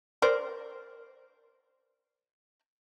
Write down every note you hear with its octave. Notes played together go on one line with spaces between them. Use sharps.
A#4 C5 D5